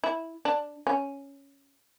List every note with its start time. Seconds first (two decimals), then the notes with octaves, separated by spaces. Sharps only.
0.04 E4
0.45 D4
0.87 C#4